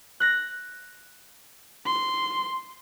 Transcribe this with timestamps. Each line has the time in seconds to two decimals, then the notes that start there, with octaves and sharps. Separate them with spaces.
0.20 F#6 A#6
1.86 C6